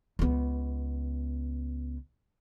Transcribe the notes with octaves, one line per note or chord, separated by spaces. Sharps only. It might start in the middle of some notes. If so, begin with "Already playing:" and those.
C#2 B3